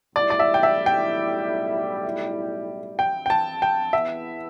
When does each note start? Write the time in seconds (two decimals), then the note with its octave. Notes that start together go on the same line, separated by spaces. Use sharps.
0.16 B1 A2 G3 E4 D5
0.30 D5
0.39 E5
0.54 G5
0.63 E5
0.86 G5
2.99 G5
3.26 G5
3.30 A5
3.62 G5
3.93 E2 E3 B3 E4 E5